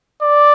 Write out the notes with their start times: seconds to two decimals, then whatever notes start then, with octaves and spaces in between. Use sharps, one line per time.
0.23 D5